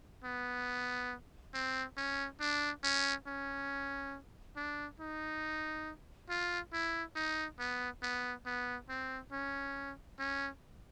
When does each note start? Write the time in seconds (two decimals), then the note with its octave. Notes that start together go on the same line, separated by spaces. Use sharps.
0.24 B3
1.54 C4
1.97 C#4
2.40 D4
2.84 C#4
3.27 C#4
4.56 D4
5.00 D#4
6.30 F4
6.73 E4
7.16 D#4
7.59 B3
8.03 B3
8.46 B3
8.89 C4
9.32 C#4
10.19 C#4